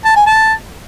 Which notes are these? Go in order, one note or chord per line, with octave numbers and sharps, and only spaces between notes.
A5
G#5
A5